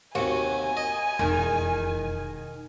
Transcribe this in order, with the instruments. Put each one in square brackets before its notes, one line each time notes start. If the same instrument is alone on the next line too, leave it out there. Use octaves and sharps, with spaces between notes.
[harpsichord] D#2 C3 [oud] F#4 [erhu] G#5
[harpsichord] D#5
[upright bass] E1 F2 [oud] D#3